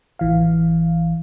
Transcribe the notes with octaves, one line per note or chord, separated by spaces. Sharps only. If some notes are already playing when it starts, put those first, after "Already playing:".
A1 E3 F5